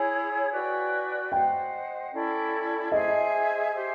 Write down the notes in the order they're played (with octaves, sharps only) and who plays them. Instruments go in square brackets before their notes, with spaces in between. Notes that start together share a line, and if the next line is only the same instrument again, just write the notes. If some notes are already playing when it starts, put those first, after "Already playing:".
Already playing: [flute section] E4 G#4 C#5 [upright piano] G#5
[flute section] F#4 B4 D5 G5
[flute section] C5 D#5 F#5 [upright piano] G5
[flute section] C#4 E4 A4 D5
[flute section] G#4 C5 E5 G#5 [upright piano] D#5
[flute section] G4 C5 E5